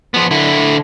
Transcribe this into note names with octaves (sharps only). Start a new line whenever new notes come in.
F3 B3
D3 E4